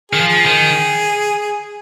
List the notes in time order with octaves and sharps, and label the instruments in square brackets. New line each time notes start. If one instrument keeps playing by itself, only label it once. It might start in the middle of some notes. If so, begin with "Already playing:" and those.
[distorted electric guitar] D#3 [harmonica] G#4
[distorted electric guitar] F3
[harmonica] G#4
[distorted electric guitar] D#3